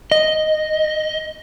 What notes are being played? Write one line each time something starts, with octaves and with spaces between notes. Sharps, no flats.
D#5